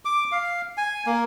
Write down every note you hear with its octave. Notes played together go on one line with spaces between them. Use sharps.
D6
F5
G#5
A#3